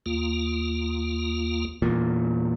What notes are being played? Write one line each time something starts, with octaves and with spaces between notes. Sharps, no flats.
D#2 A#3 F4
E2 A#2